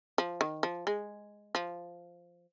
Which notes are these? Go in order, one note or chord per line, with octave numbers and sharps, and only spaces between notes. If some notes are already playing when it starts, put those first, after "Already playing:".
F3
D#3
F3
G#3
F3